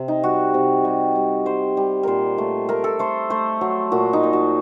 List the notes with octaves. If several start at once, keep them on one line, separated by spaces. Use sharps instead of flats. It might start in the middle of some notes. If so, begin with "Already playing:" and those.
Already playing: C3
D#4
G3 F#4
C3
G3
G3
G3 C5
G3
A#2 A#4 C5
A3
A3 A#4
A4
A3 C5
A3 C5
F#3
A#2 F#4
D#4
A#2
F#4